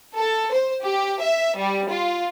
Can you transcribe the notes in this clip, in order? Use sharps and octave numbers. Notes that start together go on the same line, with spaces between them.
A4
C5
G4
E5
G3
F4